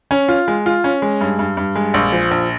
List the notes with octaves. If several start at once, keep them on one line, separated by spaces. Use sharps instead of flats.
C#4
F4
G#3
F4
C#4
G#3
G2
G2
G2
G#3
A#1
F3
A#1